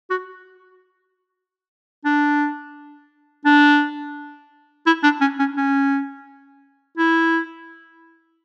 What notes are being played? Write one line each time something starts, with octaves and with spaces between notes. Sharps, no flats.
F#4
D4
D4
E4
D4
C#4
C#4
C#4
E4